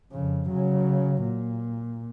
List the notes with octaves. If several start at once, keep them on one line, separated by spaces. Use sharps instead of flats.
F2 C#3
C#3 F#3
A#2